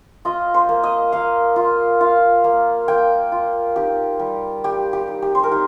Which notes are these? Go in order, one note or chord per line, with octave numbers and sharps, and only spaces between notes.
F4 D#5
C5
A#3
D#5
A#3 F5
F4
F4 F5
A#3
A#3 G5
F4
D#4 G4
G3
G3 G4
G4
D#4
G4
C5
A#4
D#4 G4